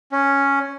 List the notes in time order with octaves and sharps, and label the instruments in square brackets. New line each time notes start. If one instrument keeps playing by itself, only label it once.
[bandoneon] C#4